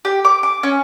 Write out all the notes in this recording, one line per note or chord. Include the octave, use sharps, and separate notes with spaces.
G4
D6
D6
C#4